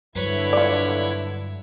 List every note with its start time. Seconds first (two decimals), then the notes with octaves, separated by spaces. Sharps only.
0.15 G2 D3 F#3 E4 B4 C#5 G#6
0.53 F4 D5